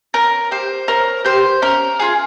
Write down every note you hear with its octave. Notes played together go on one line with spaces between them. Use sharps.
C#4 A#4
G4 C5
C#4 A#4
G4 C5
C#4 A#4
F4 G#4